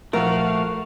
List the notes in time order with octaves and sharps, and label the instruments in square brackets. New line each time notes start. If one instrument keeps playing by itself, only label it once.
[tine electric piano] A#1 F3 [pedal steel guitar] A3 F#4 [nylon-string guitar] A#4 [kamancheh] F5 F#5